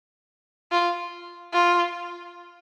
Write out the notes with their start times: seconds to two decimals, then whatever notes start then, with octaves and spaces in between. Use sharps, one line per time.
0.72 F4
1.53 F4